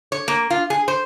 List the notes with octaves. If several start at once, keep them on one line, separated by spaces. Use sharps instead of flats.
C#5
A#3
F4
G#4
C5